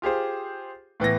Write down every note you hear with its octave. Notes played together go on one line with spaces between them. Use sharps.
F4 G4 G#4 C5
A2 E3 B3 A#6